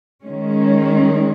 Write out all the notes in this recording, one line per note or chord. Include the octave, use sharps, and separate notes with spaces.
D#3 G#3 C#4